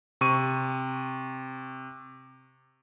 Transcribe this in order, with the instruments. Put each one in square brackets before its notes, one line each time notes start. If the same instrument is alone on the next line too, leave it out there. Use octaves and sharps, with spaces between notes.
[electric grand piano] C3 C#6 D#7